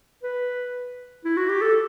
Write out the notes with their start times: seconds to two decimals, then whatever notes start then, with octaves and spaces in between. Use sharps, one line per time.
0.23 B4
1.25 E4
1.37 F#4
1.49 G4
1.62 A4